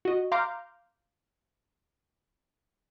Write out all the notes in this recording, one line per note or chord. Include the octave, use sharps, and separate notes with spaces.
F#4 D#5
F5 A#5 C6 D6 F6 G6